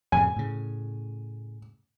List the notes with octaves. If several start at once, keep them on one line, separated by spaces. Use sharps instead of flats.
F2 A2 C#3 G#5
A2 C#3